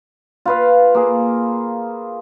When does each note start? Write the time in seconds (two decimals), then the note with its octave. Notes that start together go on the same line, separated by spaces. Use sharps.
0.46 F4 B4 F5
0.95 A#3 G#4